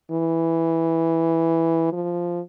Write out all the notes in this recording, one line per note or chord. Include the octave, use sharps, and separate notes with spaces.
E3
F3